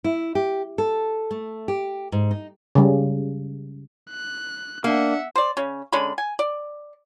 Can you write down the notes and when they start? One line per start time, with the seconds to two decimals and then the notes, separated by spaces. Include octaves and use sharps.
0.04 E4
0.35 G4
0.78 A4
1.31 A3
1.68 G4
2.12 G#2
2.31 D#4
2.75 C#3 G3
4.11 F#6
4.84 A#3 D4 E5 F#5
5.36 C5 D5
5.57 C#3 C#4
5.92 D3 G#3 C#4 B5
6.18 G#5
6.39 D5